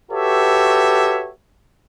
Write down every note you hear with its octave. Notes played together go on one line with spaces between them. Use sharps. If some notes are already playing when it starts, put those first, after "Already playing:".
F#4 G4 A4 B4 C#5 E5